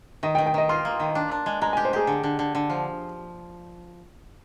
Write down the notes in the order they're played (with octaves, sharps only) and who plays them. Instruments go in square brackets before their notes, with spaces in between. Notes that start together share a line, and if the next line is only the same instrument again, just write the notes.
[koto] D#3 [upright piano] D#5
[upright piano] G5
[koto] D#3
[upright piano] G5
[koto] D#3 [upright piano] D#5
[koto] F4 [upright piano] C6
[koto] A#3
D#3
D4
D4
G#3
[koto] G#3 [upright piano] A#5
[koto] G4 [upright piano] G#5
[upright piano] C5
[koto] G4 [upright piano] G#4
[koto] D3
D3
D3
D3
F3